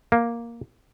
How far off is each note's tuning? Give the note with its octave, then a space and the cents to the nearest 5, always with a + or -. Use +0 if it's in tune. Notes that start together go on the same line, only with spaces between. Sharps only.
A#3 +5